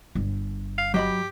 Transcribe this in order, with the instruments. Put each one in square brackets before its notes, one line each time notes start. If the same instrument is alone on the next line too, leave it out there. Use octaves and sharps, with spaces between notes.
[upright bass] G1
[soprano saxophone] F5
[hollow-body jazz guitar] F#3 D#5 B5 [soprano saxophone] G4